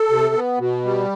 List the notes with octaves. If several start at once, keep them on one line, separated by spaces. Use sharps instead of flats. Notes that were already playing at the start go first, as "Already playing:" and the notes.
Already playing: A4
C3
B3
B2
G3